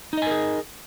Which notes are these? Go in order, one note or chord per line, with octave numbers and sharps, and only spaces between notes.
D#4 G#4 A#4 D#5 G#5